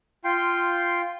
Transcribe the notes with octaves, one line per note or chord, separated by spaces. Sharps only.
F4 G5 C6